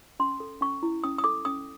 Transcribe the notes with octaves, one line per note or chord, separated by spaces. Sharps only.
C#4 C6
A4
C#4 C#6
E4
C#4 D#6
D#6
A4 D6
C#4 D#6